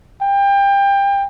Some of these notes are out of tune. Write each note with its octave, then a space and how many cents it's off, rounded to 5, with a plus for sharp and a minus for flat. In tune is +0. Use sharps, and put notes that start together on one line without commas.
G5 +25